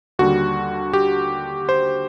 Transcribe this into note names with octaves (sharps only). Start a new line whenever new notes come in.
D#2 D3 G3 F#4
G4
C5